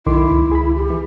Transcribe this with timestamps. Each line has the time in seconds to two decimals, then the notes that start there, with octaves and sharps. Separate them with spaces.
0.06 B1 D#3 E4 C6 D6
0.31 C#2
0.52 G#4 B5
0.75 G4
0.90 E3